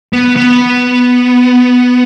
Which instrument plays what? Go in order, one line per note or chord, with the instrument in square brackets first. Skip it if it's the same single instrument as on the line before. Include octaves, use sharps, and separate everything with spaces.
[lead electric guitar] B3
B3